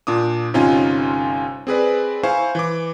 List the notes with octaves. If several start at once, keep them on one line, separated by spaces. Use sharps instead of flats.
A#2 D4 D6 D#6
G1 C3 C#4 D#4 F4 G#5
C4 G#4 B4 D5
E4 C5 F5 G#5 C#6
E3 D6